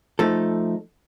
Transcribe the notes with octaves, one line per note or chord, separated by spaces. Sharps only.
F3 A3 D#4 A4